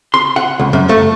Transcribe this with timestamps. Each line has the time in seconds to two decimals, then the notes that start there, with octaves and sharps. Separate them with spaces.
0.14 C6
0.36 F#5
0.60 C#2
0.73 F#2
0.89 A3